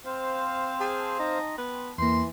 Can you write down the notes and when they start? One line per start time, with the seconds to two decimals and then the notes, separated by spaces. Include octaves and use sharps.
0.05 C4 C5 F5
0.81 G#4 G5 A5 C6
1.19 D#4
1.58 B3
1.98 E2 E3 A#3 C6